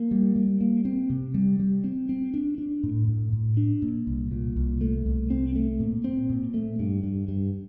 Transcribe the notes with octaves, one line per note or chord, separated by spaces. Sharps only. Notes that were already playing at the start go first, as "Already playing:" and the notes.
Already playing: A#3
G3
G3
A#3
C4
C3
G3
G3
C4
C4
D4
D4
A2
A2
A2
D4
A#2
C2
A#2
C2
A3
C2
C4
A3
A#2
C4
A#2
A3
G2
G2
G2